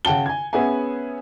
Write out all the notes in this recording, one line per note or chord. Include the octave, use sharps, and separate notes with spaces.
C#3 F#5 G5 A5 G7
G#5 G#6
B3 C#4 G#4 E5 F#5 G#5